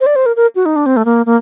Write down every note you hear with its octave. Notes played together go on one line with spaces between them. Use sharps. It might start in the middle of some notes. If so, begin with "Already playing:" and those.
C5
D5
C5
A#4
A#4
F#4
D#4
D4
C4
A3
A#3
A#3